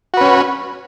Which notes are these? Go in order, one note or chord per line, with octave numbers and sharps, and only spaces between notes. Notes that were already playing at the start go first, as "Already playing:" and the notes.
C#4 F#4 B4